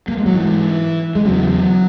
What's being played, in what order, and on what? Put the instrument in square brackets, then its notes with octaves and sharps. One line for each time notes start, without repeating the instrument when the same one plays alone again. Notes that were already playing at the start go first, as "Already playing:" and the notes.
[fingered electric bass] A#3
G#3
F#3
G#2 E3
G#3
E2 C#3 F#3